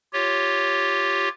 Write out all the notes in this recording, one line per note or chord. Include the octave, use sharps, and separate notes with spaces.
F4 G4 C#5